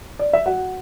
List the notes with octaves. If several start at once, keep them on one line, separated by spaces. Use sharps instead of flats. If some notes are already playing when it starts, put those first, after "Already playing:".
D5
E5
F#4 F#5